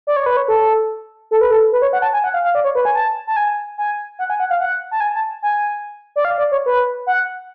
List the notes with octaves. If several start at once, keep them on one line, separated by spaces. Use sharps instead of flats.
D5
C#5
B4
C#5
A4
A4
B4
A4
B4
C#5
F#5
A5
G#5
F#5
F5
F5
D5
C#5
B4
G#5
A5
A5
G#5
G#5
F#5
G#5
F#5
F5
F#5
A5
G#5
A5
G#5
D5
F5
D5
C#5
B4
F#5